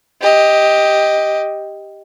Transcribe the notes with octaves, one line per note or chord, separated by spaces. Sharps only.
G4 D#5